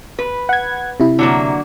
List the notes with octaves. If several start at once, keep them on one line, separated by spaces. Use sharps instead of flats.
B4
F#5 G#6
C3 E4
D3 F#3 A#3